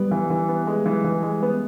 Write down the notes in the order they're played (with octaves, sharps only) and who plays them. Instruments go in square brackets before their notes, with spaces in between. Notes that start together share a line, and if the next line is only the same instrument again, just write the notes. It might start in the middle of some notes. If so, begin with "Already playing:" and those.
Already playing: [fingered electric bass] G3 [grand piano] B3
[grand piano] E3
E3
B3
G#3
E3
E3
G#3
B3